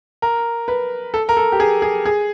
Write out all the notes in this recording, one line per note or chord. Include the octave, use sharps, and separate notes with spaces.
A#4
B4
A4
A#4
A4
G4
G#4
G#4
G#4